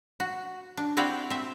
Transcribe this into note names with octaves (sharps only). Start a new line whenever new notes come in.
F#4
D4
C4 E4 F#4 D5 F5 G5
C4 E5